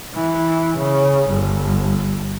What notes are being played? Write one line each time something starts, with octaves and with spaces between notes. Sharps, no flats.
E3
C#3
G1